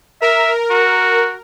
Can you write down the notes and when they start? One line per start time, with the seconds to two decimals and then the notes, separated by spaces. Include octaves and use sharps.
0.22 A#4 E5
0.70 F#4